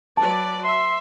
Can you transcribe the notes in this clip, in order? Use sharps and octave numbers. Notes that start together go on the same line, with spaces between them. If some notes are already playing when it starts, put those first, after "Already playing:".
F#3 B4 D5 A5
E5 C6